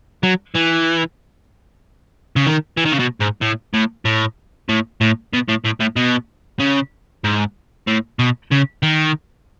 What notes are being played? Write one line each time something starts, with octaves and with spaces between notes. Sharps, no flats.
F#3
E3
C#3
D#3
E3
D#3
C#3
B2
G#2
A2
A2
A2
A2
A2
B2
A2
A2
A2
B2
C#3
G#2
A2
B2
C#3
D#3